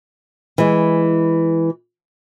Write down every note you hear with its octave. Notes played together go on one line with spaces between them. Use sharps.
E3 G#3